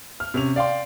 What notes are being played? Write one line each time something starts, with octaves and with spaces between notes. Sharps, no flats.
F6
C3 C#4 F7
D5 F5 G5 C6